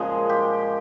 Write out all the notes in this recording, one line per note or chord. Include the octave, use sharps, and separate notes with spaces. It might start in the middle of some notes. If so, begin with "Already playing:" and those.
Already playing: A#2 C#3 F3 G#3 G#4
G4